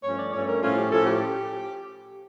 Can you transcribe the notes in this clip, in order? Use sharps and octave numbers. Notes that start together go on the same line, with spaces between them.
G2 F3 A3 C#4 C#5
D5
G2 F3 A3 C#4 C#5
A#4
A2 F3 A3 C#4 F4
G4
A2 F3 A3 C#4 A4
G4